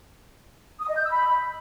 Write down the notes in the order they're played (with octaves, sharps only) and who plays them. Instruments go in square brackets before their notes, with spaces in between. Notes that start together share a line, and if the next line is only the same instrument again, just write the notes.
[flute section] D#6
D#5
G6
E6
B5